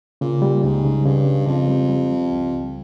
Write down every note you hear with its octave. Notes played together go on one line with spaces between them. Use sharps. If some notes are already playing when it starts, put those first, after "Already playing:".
A#2 C#3
G3
C#2 G#2
C#3
G2 C#3
G3
F2 C#3
G3
G3
G3
C#2
C#2